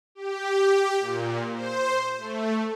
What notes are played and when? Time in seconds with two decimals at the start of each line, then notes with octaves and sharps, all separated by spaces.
0.15 G4
1.00 A#2
1.52 C5
2.18 A3